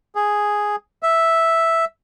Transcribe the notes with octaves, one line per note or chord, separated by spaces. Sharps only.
G#4
E5